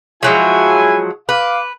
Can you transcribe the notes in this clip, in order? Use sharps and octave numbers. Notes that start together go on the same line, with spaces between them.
F3 F#3 G#3 E4 G#5
B4 F5 D6